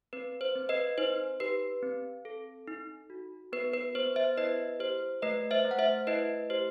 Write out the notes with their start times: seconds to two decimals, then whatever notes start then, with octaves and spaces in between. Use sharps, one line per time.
0.13 C4 B4
0.41 C5
0.55 C4
0.69 B4 D#5
0.98 D#4 C5
1.40 G4 B4
1.83 C4
2.25 A4
2.68 D#4
3.10 F#4
3.52 B3 B4
3.74 B4
3.95 B3 C5
4.16 C5 E5
4.38 E4 B4 D#5
4.79 G4 C5
5.22 A3 B4 D#5
5.51 C5 E5
5.65 A3
5.71 F#5
5.79 C5 E5
6.07 E4 B4 D#5
6.50 G4 C5